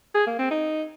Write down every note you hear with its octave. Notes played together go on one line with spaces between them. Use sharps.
G#4
A#3
C4
D#4